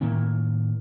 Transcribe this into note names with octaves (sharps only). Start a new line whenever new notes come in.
A2 D#3 A#3 C#4